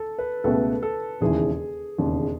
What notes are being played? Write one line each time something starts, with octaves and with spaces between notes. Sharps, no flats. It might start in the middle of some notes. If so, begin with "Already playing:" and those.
Already playing: A4
B4
C#2 B2 A3 A4
A4
E1 D#2 C#3 E3 G#4
E1 D#2 C#3